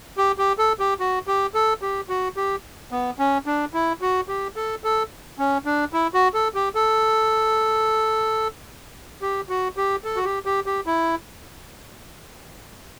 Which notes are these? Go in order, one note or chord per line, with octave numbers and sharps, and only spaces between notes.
G4
G4
A4
G4
F#4
G4
A4
G4
F#4
G4
B3
C#4
D4
E4
F#4
G4
A4
A4
C#4
D4
E4
F#4
A4
G4
A4
G4
F#4
G4
A4
F#4
G4
G4
G4
E4